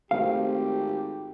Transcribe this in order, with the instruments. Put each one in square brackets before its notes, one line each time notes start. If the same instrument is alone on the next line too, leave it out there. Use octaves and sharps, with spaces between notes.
[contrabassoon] G#1 [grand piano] A3 C4 F#4 [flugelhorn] G4 [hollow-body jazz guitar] F5